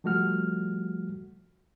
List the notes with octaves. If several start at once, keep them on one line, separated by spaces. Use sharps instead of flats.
F3 G3 A3 F#4 F6